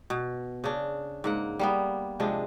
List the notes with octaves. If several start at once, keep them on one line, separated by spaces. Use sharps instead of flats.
B2
C#3 D4
G#2 A#3 F#5
G3 A#3 B3
C3 F3 G#3 D4